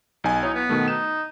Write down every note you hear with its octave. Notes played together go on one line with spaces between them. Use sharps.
B1 D#4 G#5
D#4 E4 C#5
B3
B2 D#3 A3
D#4 E7